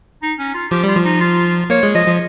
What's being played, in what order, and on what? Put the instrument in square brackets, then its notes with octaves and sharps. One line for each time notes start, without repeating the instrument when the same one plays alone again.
[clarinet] D#4
C#4
F4
[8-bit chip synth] F3 [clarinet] G4
[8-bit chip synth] G3 [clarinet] F4
[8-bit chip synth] F3
[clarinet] D#4
F4
[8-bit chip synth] A#3 [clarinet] C#5
[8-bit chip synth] G#3
[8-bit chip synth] F3 [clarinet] D#5
[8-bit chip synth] F3